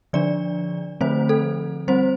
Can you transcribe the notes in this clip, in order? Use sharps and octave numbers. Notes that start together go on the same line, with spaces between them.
D3 F3 D4 D5
D3 F3 A3 C4 C5
A4
G3 C4 C5